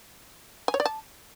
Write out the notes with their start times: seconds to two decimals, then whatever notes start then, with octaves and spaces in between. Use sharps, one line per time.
0.68 G#5
0.74 C#5
0.80 D5
0.86 A5